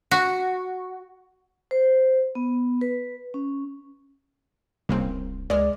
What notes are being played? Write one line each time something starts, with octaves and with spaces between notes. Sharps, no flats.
F#4
C5
B3
B4
C#4
D1 C2 C#3 A#3 C4
C#2 G#3 D5 F6